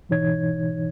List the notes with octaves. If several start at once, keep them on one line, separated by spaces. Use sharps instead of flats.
G#2 B2 E3 D#4 C#5 G#6